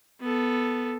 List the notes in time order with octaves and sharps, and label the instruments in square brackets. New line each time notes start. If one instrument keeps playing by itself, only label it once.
[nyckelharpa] B3 A4